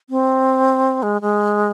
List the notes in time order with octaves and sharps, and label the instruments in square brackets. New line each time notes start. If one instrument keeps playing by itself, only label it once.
[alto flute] C4
G#3
G#3